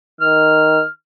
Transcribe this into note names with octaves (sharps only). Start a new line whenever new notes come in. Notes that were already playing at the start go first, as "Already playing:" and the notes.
D#3 F6